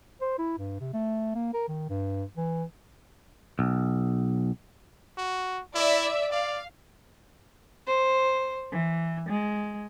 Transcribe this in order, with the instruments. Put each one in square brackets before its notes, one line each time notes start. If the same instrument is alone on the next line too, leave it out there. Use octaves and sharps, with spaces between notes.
[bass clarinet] C5
E4
G2
C3
A3
A#3
A#4
D#3
G2
E3
[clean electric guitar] B1
[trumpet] F#4
[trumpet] E4 [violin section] D5 E5
[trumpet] D5 [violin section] F5
[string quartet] C5
E3
G#3